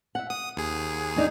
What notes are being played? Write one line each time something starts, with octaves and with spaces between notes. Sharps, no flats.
E5 F#5
F#5 D#6
D#2 G#4
E2 D4 D#4